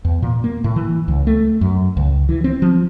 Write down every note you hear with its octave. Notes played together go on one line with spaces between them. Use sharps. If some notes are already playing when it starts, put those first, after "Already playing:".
E2
A#2
A#3
A2
E3
C#2
A3
F#2
C#2
E3
C4
F3